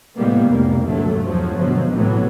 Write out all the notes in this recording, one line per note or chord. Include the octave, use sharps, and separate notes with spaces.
A2 C3 G3 G#3 A#3 B3
F1 C2 G3 A#3
D2 G2 A#2 F#3 A3
E2 F3 F#3
G1 B2 F3 F#3 G#3
C2 A2 C3 E3 F#3 B3